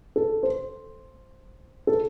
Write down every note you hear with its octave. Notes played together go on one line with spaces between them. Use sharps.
A4
C5
A4